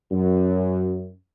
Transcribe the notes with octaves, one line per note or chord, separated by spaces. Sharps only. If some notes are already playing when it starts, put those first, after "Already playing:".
F#2